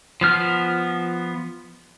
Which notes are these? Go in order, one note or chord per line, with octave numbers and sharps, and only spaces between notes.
F3 B3 F6